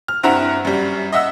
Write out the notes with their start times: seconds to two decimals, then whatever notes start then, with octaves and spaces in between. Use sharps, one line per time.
0.08 F6
0.23 G2 C4 E4 F#5 A#5
0.65 F#2 G3
1.12 D#5 E5 F#5 E6